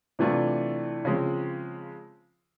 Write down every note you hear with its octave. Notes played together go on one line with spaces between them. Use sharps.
C3 E3 A3 D4 F4
C#3 F3 G#3 C4